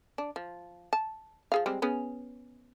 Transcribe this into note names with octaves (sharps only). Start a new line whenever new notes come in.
D4
F3
A5
F3 G#4 F5
G3 G#3 C4
B3 C#4 G#4